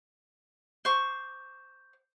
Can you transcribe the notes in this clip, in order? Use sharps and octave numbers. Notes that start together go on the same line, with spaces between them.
C5 C#6 D6